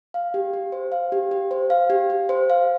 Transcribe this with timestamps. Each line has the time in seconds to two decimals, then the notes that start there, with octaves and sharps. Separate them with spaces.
0.14 F5
0.34 G4
0.53 G4
0.72 C5
0.92 F5
1.12 G4
1.31 G4
1.51 C5
1.70 F5
1.90 G4
2.10 G4
2.29 C5
2.50 F5